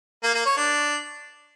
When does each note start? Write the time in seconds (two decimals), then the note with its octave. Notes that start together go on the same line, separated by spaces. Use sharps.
0.23 A#3
0.34 A#3
0.46 C#5
0.57 D4